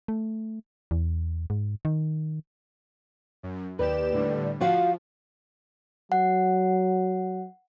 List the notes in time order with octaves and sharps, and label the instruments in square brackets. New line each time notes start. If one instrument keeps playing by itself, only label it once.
[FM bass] A3
E2
G#2
D#3
[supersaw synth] F#2
[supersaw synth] D#2 G4 E7 [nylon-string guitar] B4 [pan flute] D5
[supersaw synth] A2 D3 G3
[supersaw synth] F3 [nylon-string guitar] F4 F#4 [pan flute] F5
[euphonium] F#3 [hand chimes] F#5